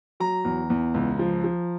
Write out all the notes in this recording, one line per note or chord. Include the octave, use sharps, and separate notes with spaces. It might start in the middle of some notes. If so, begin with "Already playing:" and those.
F#3 A#5
E2
E2
C#2
F3
F3